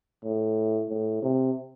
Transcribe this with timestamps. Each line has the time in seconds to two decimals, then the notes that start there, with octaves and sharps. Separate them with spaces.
0.24 A2
0.90 A2
1.22 C3